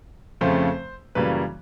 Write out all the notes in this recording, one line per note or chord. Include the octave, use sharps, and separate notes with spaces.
F2 C#3 F3 A3 C5
F#2 C#3 E3 G3 A#3 B4